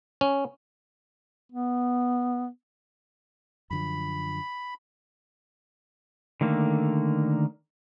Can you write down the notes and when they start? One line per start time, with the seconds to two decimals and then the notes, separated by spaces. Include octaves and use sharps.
0.21 C#4
1.52 B3
3.71 F#2 D3 F3 B5
6.41 D3 D#3 A3 A#3